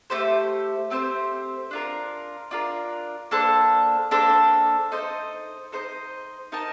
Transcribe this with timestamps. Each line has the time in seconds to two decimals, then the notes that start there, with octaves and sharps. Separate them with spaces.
0.10 A3 C4 G4 C5
0.90 A3 C4 G4 C5
1.71 D4 F4 A#4
2.51 D4 F4 A#4
3.31 A#3 D4 A4 C5
4.11 A#3 D4 A4 C5
4.92 D#4 A4 C5 D#5
5.72 D#4 A4 C5 D#5
6.52 D#4 A#4 D#5 A5